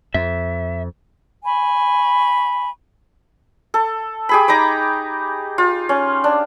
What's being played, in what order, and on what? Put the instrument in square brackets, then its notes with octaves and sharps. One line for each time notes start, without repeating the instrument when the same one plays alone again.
[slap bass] F2 [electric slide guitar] E5
[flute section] G#5 B5 C#6
[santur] A4
G4 G#4 B5
D#4 A#5 B5 D6
F4
C#4
D4